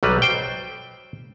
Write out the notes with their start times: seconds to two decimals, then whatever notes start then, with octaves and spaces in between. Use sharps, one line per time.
0.03 B1 F#3 G3 B4
0.22 C5 G5